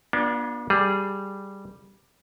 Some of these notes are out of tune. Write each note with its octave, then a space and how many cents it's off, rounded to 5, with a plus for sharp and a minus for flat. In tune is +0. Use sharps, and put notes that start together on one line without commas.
B3 -45 D4 +0 F4 +0
G3 +0 G#4 +0